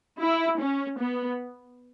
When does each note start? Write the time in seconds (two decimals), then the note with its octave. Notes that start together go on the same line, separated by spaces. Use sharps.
0.20 E4
0.60 C#4
0.99 B3